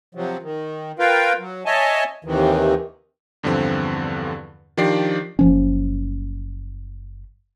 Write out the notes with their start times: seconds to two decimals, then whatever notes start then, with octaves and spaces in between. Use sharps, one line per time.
0.15 C3 F3 F#3
0.43 D#3
0.99 F4 A#4 B4 F5 G5
1.39 F#3
1.66 C#5 D#5 E5 G#5 A5
2.25 D#2 C3 D#3 E3
3.43 E2 G2 D3 F3 C4
4.77 D#3 F3 D4 G4 D5 C7
5.39 F#1 F3 C#4